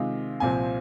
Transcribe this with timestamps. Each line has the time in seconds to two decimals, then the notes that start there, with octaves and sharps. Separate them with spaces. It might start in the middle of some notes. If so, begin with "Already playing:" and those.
Already playing: C3 D#3 G#3 F4
0.40 C2 A#2 F3 C4 G#5